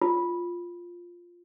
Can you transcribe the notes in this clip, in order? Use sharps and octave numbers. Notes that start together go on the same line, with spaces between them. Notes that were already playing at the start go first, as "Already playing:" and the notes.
F4